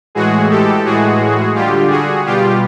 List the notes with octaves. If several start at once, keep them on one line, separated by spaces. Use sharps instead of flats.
A2 E3 G#3 F#4 G#4
G4 A4
A2 E3 G#3 F#4 G#4
D3 G3 F4 G4
F#4 G#4
B2 G3 F4 G4